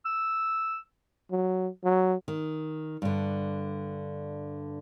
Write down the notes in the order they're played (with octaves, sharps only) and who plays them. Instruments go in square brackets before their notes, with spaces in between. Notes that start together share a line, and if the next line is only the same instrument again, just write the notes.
[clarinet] E6
[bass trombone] F#3
F#3
[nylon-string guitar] D#3
G2 D3